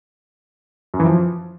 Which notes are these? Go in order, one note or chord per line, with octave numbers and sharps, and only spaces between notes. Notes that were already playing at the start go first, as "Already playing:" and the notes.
F#2
E3
F3